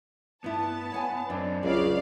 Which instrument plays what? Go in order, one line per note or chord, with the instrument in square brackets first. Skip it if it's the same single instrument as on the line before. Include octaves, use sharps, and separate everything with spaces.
[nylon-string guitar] G2 E4 [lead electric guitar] B3 [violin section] A5
[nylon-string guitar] C#5 F#5 G#5
[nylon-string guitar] F#2 [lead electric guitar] C4 D4
[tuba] C#2 [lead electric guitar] C#3 [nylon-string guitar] F#3 [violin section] D5 F5